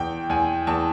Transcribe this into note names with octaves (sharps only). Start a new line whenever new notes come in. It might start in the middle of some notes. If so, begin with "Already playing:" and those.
Already playing: E2 G5
E2 G#5
E2 A5